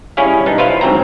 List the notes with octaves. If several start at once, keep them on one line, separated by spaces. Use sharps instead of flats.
G3 C#4 E4 G#4 C#5 F5
B1 B3 D4 D#4
E4 F4 B4 C5 F5
G#2 D3 F#3 C4 G5 A#5